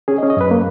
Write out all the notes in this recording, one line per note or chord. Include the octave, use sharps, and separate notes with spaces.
C#4 G#4
D#5
C#4
D#5
F#2 B4
A#3